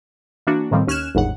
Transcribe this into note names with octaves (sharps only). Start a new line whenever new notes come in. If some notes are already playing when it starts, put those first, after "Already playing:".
E3 A#3 D4 F#4
C#2 A2 D#3 F3 G3 C4
D#2 C#4 F6 F#6 G#6 E7
G1 D#2 G#2 C#3 F#5